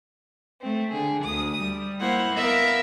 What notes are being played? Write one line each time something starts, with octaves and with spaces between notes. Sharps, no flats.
A3 C4
D3 G#4
D2 D#6
G3
A#3 E4 C5 F#5
B3 A#4 E5 F5